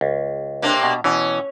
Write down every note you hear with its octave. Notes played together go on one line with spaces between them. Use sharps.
C#2
C3 A#3 D4
B2
B2 E3 C#4